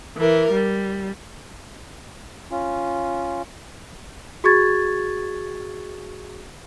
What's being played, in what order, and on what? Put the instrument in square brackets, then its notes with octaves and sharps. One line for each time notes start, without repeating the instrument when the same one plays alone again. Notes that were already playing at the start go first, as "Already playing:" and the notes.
[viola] E3 A#4
G3
[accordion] C#4 F4
[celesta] F#4 G#4 C#6 G#6 A6